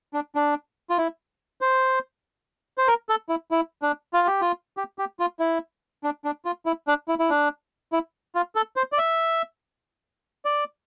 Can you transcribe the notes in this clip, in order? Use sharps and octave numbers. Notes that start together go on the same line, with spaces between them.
D4
D4
F4
E4
C5
C5
A#4
A4
E4
E4
D4
F4
G4
F4
G4
G4
F4
E4
D4
D4
F4
E4
D4
E4
E4
D4
E4
F4
A4
C5
D5
E5
D5